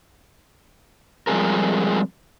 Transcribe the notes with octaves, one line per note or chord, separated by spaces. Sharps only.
F3 G3 G#3 C4 G#4 A#4